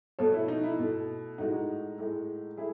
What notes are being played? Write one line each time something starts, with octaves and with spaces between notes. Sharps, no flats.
B2 A3 A4 C#5
E4
D#4
E4
B2 A3
A2 G#3 D#4 F#4
A2 G#3
A3 E4 G#4